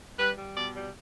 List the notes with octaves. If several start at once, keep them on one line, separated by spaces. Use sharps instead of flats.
G3 B4
G3
B2 D5
G3